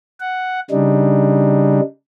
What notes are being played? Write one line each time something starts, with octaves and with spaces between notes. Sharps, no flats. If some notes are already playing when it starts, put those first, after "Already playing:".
F#5
C#3 G3 D4 D#4